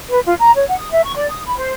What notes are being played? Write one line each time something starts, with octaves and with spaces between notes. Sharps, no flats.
B4
F4
A#5
C#5
F#5
D#6
E5
C#6
D5
D#6
B5
C5